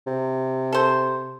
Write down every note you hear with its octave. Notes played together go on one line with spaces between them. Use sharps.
C3
A4 C5